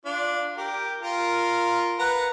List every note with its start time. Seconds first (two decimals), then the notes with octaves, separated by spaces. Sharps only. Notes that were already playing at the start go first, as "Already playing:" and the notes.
0.05 D4 F4
0.57 G4 A#4
1.01 F4 A#4
1.99 B4 F#5 A#5